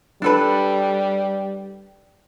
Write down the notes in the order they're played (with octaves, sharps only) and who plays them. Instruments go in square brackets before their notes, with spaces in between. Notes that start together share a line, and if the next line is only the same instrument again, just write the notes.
[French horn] G3 [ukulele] D4 A4 B4